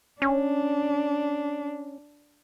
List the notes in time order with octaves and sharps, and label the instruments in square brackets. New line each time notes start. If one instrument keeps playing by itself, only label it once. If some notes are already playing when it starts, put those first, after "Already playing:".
[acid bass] C#4 [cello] D4